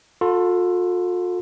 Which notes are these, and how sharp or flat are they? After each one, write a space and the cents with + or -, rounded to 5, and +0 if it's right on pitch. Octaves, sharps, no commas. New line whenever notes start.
F4 +45 A4 +15 C6 -30